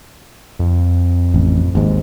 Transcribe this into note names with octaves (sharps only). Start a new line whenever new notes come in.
F2
A1
G#1 D#2 G#2